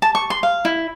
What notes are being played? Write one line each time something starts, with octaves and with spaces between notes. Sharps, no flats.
A5
C#6
C6
F5
E4